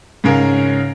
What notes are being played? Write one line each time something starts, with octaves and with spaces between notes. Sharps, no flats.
G#2 C#3 C#4 A#4 F5